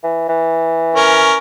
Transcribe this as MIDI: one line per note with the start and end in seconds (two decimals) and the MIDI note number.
0.04 0.25 52
0.29 1.37 52
0.96 1.38 61
0.96 1.38 70